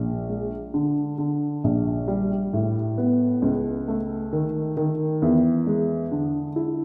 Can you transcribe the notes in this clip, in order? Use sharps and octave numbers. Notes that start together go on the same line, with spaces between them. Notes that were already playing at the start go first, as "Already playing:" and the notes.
Already playing: A#1
G#3
D3
D3
A#1
G3
A2
B3
C#2
A3
D#3
D#3
E2
G#3
D3
E4